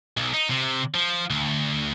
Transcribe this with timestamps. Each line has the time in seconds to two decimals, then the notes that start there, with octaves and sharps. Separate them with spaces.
0.17 B1
0.34 D#4
0.50 C3
0.94 F3
1.30 D2